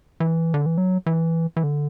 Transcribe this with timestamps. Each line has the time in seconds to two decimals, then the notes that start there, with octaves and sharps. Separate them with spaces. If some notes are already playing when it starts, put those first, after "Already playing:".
0.20 E3
0.54 D3
0.66 E3
0.78 F#3
1.06 E3
1.57 E3
1.64 D3